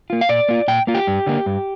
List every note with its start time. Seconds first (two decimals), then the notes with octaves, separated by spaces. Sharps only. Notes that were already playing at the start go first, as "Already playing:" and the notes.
0.10 A#3 F4
0.21 F5
0.29 A#2 D5
0.49 A#3 F4
0.68 A#2 G5
0.87 A#3 F4
0.95 G4
1.07 G2
1.27 D3 A#3
1.46 G2